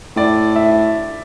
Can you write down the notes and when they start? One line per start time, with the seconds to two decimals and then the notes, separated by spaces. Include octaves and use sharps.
0.16 A2 D5
0.56 E5